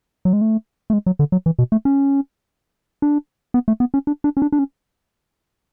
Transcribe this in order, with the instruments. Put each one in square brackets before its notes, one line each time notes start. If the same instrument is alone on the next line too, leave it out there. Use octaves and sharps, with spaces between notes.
[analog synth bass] F#3
G#3
A3
A3
G#3
F#3
D3
F#3
E3
B2
A3
C#4
D4
B3
A3
B3
C#4
D4
D4
C#4
D4
D4
C#4